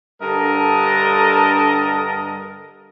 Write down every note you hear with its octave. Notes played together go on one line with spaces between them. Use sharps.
G2 D3 A4 A#4 D#5 A5